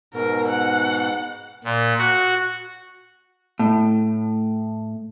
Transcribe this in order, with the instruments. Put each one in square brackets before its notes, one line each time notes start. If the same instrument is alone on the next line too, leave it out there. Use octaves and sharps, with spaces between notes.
[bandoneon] G#2 B2 [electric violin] A#4
[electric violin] F#5
[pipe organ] A#2
F#4
[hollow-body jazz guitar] A2